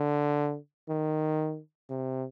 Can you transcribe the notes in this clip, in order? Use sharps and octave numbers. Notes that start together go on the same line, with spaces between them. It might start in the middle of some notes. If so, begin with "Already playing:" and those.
Already playing: D3
D#3
C3